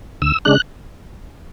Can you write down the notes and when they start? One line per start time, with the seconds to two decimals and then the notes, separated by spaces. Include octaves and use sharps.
0.22 D2 E6
0.45 C#3 G#3 D4 F#6